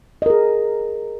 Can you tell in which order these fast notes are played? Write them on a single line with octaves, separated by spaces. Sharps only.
D#5 A#4 G#4